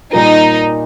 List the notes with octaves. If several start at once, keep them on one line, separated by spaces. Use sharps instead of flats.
A#2 G3 A#3 D#4